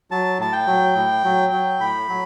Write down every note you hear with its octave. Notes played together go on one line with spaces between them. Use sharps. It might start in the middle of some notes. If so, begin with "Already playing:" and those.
F#3 A5
A2 A5
G5
F#3
A2
F#3
F#3
A2 B5
F#3